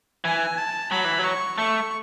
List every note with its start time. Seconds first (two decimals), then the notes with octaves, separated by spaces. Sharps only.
0.25 E3 G#5
0.58 A5
0.91 F#3 B5
1.05 E3
1.19 F#3
1.24 C#6
1.58 A3 C#6